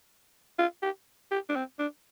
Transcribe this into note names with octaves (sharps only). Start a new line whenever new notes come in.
F4
G4
G4
D4
C4
D4